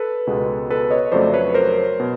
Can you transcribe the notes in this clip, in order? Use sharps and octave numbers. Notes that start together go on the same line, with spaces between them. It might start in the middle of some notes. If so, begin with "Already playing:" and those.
Already playing: A4 B4
C#2 B2 G#3 B3
A4 B4
C#5 D#5
F2 C#3 F#3 A3 C5 D5
B4 C#5
A#4 C5
B2